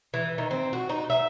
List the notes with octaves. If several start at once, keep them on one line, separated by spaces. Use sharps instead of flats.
E3
D#3
C4
F#4
D#4
E5